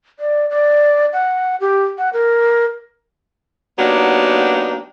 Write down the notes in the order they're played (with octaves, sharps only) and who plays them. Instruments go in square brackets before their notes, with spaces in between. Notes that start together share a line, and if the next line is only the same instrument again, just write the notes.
[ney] D5
D5
F#5
G4
F#5
A#4
[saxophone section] F#3 A#3 B3 D4 D#4 G4